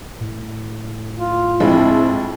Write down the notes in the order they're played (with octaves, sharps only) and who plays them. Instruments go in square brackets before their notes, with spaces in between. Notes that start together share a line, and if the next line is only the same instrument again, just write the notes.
[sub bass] A2
[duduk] F4
[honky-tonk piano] D2 F3 G#3 [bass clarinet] C4 [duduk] E4